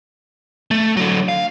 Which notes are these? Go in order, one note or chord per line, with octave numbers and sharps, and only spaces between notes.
A3
D3 F#3
F5